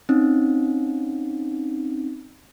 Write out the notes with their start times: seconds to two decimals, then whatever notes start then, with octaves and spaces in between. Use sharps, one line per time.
0.09 C4 C#4 D#4